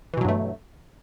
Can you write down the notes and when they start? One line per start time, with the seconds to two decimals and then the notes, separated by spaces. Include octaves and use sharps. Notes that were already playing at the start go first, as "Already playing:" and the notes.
0.14 E3
0.17 B2
0.21 F#3
0.25 G2
0.28 A3